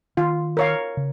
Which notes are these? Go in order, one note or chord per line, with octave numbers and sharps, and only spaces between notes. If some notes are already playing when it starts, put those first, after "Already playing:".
D#3 F4
A#4 C#5 F5
C#3